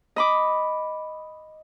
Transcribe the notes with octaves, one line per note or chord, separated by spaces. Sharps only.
D#5 B5 D6